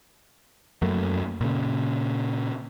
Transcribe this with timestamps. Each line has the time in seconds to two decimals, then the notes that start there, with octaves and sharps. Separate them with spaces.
0.82 F#2 F#3 A3 A#3
1.41 A#2 C#3